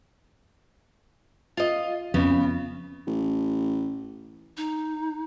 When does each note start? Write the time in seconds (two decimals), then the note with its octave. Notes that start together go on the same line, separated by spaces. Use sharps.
1.57 F4 D#5
2.14 F2 C#3 B3
3.07 A1
4.57 D#4